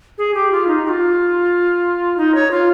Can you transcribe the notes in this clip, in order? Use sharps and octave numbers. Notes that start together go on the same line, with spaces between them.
G#4
G4
F4
D#4
G4
F4
D#4
C#5
F4